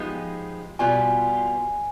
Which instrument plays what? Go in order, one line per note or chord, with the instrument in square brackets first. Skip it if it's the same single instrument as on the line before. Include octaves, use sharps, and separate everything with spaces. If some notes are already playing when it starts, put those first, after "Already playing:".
Already playing: [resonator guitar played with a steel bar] F3 G#3 B3 D#4 G4
[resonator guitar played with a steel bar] B2 G3 B3 F4 [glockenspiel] G#5